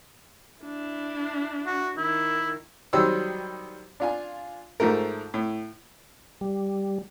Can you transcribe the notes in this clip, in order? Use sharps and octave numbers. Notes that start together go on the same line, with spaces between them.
D4 E4
F#4
D#3 E4
D#3 F#3 G3 C5 E6
D4 F4 G#5
G#2 F3 A3 A#4
A2
G3